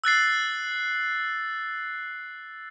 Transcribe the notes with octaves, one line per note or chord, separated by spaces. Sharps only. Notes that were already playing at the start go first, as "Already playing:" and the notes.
E6 F#6 A6 C7